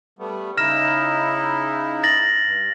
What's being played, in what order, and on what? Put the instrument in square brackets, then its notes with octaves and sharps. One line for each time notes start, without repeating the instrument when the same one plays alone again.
[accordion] G3 A3 B3
[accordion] C#3 D#4 E4 [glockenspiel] F6 A#6 E7
[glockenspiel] A6 A#6 F#7
[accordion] G2